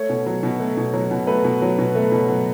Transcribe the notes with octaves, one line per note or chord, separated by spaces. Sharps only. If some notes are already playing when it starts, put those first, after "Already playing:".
Already playing: A3 C#5
B2
F#3
B2
A3
B2
F#3
B2
A3 B4
B2
F#3
B2
A3
B2
F#3